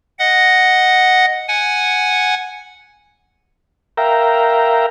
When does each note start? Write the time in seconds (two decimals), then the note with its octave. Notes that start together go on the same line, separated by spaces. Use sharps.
0.19 D#5 F#5
1.48 F#5 G#5
3.97 A#4 E5 F5 G5 A#5